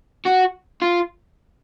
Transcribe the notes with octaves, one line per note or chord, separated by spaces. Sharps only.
F#4
F4